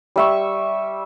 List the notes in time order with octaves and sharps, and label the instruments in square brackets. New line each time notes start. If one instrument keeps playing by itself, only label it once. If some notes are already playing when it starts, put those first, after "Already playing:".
[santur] G3 E5 C#6